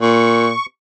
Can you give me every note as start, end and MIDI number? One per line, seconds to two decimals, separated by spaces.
0.01 0.52 46
0.01 0.66 85